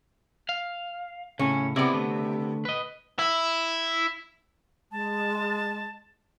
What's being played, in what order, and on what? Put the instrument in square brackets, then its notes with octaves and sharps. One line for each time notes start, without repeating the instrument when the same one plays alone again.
[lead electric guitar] F5
[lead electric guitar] A2 C#3 [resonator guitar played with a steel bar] C#4
[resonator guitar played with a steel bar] C3 B3 [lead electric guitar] E4 D5
[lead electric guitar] D3 A3
B4 D#5
[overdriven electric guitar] E4
[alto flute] G#3 [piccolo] A5